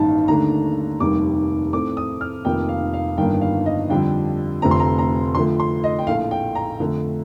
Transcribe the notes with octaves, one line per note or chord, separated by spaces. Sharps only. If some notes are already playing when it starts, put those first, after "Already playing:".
Already playing: A1 G2 D#3 A#3 D#4 A5
D#2 D3 A3 D4 A#5
F1 D#2 D#3 G3 D6
A2 A3 C4 D6
D#6
F6
F1 F2 D#3 A#3 G5
F5
F5
G1 G2 D#3 A#3 D4 G5
F5
D#5
F2 D3 G3 D4 G5
F1 F2 D3 A3 C4 A#5
C6
A#5
A#5
F2 D3 F3 A3 C6
C6
D#5
G5
A#1 A2 A3 F5
G5
A#5
F2 D3 A3